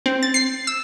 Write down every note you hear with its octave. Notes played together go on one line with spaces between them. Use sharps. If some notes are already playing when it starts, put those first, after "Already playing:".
C4
A6
C7
E6